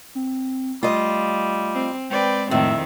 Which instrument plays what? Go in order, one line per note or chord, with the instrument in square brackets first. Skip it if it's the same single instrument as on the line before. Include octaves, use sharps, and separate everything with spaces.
[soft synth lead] C4
[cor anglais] G3 [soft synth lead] A3 [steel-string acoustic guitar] F4 D#5
[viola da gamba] C4
[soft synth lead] G#3 [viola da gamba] C4 B4 D5 [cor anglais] G5
[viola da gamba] F2 D#3 C4 [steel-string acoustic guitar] A2 [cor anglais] E5